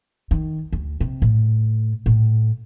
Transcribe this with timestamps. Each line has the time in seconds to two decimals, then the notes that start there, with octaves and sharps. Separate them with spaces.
0.31 D#3
0.72 D2
1.01 C3
1.22 A2
2.06 A2